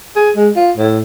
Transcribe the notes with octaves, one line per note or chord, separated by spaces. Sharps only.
G#4
G#3
F4
A2